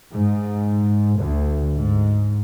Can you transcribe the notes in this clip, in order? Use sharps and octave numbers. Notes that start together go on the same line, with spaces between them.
G#2
D2
G#2